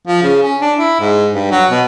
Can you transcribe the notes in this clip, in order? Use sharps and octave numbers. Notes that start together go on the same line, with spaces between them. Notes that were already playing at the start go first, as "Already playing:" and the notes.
F3
C#3
C#4
D4
E4
G#2
G2
F#3
B2